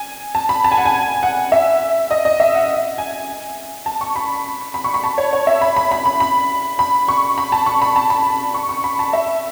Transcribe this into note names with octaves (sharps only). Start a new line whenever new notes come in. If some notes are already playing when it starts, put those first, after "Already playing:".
Already playing: G#5
A5
B5
A5
G#5
F#5
G#5
F#5
E5
D#5
D#5
E5
F#5
G#5
A5
C#6
B5
B5
C#6
B5
A5
C#5
C#5
E5
B5
B5
B5
B5
B5
B5
C#6
B5
A5
C#6
B5
A5
B5
C#6
C#6
B5
A5
E5